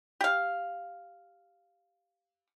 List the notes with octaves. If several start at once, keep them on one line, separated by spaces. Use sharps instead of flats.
G4 F5